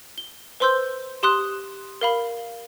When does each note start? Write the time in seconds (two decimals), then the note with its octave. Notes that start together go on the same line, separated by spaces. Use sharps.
0.18 G7
0.60 B4 C5 C6 E6 G6
1.23 G4 C6 D#6 F#6
2.01 A#4 F5 B5